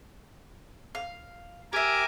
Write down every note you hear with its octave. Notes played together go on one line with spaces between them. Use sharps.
F5
G4 A#4 E5 G#5 D6